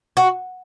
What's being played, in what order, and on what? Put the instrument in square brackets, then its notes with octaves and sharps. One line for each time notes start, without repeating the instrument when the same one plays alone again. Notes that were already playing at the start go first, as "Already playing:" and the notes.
[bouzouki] F#4